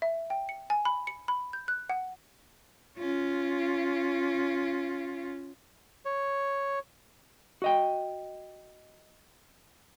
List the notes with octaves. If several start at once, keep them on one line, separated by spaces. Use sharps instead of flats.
E5
G5
C#7
G#5
B5
C#7
B5
G6
F#6
F#5
C#4 F4
C#5
F#4 D#5 G5